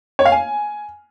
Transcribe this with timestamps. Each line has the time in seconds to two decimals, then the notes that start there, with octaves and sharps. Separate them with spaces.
0.19 C#5
0.25 F5
0.32 G#5